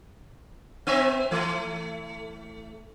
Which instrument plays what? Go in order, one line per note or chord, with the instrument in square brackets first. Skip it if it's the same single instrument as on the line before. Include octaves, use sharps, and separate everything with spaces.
[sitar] B3 C4 E5
E3 A3